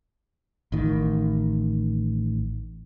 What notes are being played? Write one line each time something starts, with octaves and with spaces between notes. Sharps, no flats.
A1 D#3